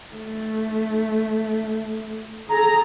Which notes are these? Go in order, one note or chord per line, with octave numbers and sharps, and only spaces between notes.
A3
G#4 A4 A#5